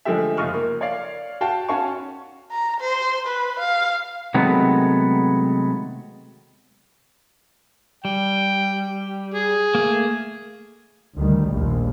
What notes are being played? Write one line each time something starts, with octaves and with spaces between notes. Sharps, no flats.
D3 F3 G#3 A3 G4 E5
F#1 F3 F4 D#5 C#6 F6
A#3
C#5 D5 F5
F#4 F5 G5 A5
C#4 F#4 C#5 F5 A5 C#6
A#5
C5
B4
F5
C3 D#3 F#3 G#3 A3 B3
G3 G5
G#4
A3 A#3
D2 D#3 G3
A#1 D#2